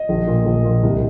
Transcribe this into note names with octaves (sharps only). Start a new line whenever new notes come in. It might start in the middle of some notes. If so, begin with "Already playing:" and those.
Already playing: D#5
A#1
A#2
A#1
A#2
C2